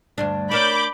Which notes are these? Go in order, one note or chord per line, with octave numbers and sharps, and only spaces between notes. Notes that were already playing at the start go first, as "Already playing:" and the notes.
D2 G2 D4
D4 A#4 C#5 B5 D6 G6